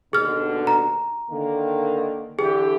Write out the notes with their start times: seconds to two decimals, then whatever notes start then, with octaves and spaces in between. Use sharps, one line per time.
0.13 D#2 B2 D3 G#4 F6
0.67 A#5
1.30 D3 D#3 A#3
2.39 D3 E3 G4 G#4